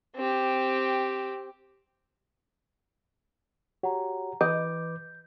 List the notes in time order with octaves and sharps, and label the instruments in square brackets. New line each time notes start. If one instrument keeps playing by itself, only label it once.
[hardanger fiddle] C4 G4
[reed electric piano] F#4 G4 C#5 [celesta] F#5 A#5
[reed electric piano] E3 B4 D6 [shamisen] D#5 [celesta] G6